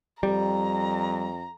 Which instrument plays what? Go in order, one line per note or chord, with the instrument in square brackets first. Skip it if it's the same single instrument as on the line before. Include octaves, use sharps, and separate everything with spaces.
[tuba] F2 [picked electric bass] G3 [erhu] A#5